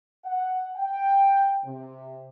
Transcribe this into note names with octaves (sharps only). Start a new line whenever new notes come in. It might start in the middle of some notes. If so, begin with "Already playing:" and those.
F#5
G5
C3